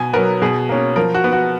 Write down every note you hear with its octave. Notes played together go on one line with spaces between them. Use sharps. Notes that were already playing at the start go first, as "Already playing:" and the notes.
Already playing: B2 G#5
F#3 B3 A#4
B2 G#4
A#3 C#4
F3 A#4
F#4
B3
F#4